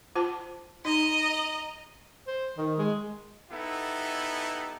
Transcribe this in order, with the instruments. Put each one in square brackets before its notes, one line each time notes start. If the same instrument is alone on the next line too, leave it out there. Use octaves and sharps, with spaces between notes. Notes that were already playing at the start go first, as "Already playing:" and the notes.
[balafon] F4 C5 A5
[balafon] D#4 [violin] D#5 A#5
[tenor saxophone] C5
D#3
G#3
[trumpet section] B3 D#4 E4 G4 A4